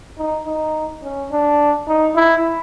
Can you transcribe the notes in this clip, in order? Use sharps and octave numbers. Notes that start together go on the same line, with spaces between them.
D#4
D#4
C#4
D4
D#4
E4